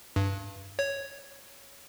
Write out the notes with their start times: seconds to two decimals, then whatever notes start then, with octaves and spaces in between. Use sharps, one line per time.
0.16 G2
0.79 C#5